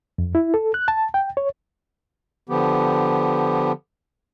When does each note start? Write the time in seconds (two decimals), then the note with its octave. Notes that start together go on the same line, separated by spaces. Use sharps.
0.18 F2
0.35 E4
0.54 A4
0.74 F#6
0.88 A5
1.14 G5
1.37 C#5
2.49 D3 F3 B3 G4